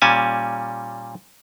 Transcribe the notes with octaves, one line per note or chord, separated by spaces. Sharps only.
A#2 G3 C#4 G#5 A5